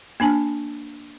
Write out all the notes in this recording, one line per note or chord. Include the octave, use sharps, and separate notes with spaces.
A#3 D4 G#5 A5